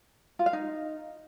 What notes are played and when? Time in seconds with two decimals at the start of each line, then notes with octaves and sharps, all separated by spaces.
0.39 F4
0.46 F5
0.53 D#4